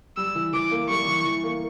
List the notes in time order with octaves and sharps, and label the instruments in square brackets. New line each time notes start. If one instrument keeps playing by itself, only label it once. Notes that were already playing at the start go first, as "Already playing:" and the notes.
[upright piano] G3 [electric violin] E6
[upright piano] E3
[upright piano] E3 [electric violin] D6
[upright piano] A#3
[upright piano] G3 [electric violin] C#6
[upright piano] E3
E3
A#3